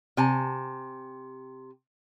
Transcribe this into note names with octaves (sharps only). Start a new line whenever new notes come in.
C3 G#5 A5